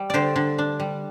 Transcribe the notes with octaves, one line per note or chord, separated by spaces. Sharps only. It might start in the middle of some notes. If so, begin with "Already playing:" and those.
Already playing: G3
D3 G4 C5 D5
D3
D4
G3